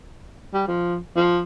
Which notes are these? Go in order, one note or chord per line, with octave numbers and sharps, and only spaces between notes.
G3
F3
F3